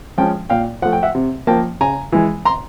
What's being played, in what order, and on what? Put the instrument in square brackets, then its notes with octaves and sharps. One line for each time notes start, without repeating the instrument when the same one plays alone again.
[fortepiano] F3 G#3 C#4 G5 A5
A#2 F5 G5
F3 A3 F#5
G5
E5 F#5
C3
F3 A#3 G5 A5
C#3 G#5 A#5
E3 G#3
A#5 C6